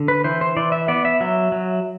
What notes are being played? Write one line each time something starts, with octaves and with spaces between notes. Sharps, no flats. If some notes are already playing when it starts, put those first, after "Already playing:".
Already playing: D3
B4
E3 C5
C5
E3 D5
E5
B3 D5
E5
F#3 E5
F#3